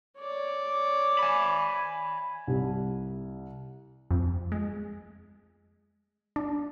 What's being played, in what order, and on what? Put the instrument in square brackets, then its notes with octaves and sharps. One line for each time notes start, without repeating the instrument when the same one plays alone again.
[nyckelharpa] C#5 D5
[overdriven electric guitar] G#5 B5
[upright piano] C2
[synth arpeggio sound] F2
G#3
D4